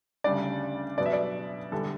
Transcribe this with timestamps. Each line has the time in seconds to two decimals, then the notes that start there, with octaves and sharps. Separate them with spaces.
0.24 D2 C#3 G3 D4 D5
0.98 B2 F#3 B3 D5
1.06 E5
1.13 D5
1.72 E2 D3 G3 D4 A4